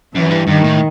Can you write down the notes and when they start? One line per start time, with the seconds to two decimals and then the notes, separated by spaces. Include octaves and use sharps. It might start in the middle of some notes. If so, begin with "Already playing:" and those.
0.15 F#2 E3
0.31 G2
0.47 G2 D#3
0.64 A2